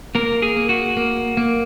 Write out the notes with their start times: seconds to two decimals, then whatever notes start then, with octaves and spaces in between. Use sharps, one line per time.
0.15 A#3 A#4
0.42 G#4
0.56 A#3
0.69 F#4
0.97 A#3
1.37 A#3